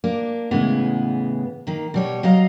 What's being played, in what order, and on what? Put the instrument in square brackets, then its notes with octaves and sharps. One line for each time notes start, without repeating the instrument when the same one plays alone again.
[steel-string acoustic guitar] A#3 D4
A2 C#3 E3 G#3 B3
D#3 A#3
B2 G3 C#5
F#3 D#5 F5 A#5